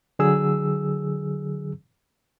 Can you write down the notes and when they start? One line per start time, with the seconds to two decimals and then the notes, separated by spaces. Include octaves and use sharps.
0.19 D3 F#3 G#4 E6